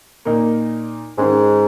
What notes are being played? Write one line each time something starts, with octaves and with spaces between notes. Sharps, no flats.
A#2 A#3 D#4
G#2 D#3 G#3 C#4 G#4